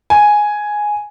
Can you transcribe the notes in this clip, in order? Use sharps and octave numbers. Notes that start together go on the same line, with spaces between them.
G#5